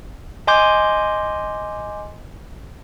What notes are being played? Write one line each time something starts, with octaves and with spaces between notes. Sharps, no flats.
D#5 G#5 C6 D6 G6